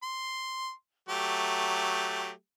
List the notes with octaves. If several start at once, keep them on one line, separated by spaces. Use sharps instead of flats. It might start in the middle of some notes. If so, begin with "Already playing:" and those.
C6
F#3 A3 G4